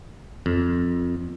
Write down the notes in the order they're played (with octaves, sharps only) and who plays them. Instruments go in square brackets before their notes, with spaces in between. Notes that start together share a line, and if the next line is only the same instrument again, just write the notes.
[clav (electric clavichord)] F2